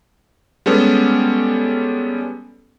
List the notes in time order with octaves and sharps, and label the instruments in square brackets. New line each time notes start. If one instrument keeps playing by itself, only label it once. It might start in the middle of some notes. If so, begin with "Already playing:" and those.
[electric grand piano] G3 G#3 B3 C#4 A4